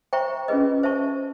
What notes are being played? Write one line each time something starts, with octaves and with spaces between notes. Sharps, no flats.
C5 E5 G5 A#5 C#6
C#4 F4 G#4 B4 D#5
C5 E5 A5 C#6